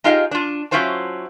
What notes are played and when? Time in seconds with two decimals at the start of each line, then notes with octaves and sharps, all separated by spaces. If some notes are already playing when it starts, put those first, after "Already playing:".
0.04 D#4 F4 G4 G#4 D#5 F5
0.31 D4 F4
0.71 F#3 C#4 E4 F4 C5 A5